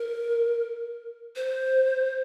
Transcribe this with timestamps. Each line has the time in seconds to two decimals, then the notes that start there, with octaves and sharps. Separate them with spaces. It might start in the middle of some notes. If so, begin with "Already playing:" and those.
Already playing: A#4
1.36 C5